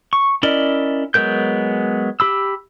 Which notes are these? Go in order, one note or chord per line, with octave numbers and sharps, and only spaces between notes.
C#6
C#4 E4 A#4 D5 D#5
F#3 G#3 B3 A#4 G6
G4 B5 E6